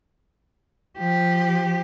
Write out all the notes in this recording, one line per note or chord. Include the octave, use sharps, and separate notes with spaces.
F3 G4